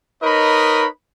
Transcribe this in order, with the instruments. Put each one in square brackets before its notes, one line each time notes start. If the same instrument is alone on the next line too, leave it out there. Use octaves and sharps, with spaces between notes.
[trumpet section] D#4 A#4 B4 C#5 D#5 B5